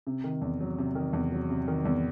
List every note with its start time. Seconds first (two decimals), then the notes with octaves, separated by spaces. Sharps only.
0.07 C3
0.24 D#3
0.41 E2
0.61 F#3
0.78 C3
0.95 D#3
1.13 E2
1.32 F#3
1.50 C3
1.68 D#3
1.85 E2